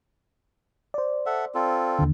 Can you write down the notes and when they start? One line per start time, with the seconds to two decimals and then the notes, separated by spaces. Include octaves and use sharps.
0.94 C5 D5
1.26 A4 E5 F#5
1.55 C4 F4 A4
1.99 D#2 D3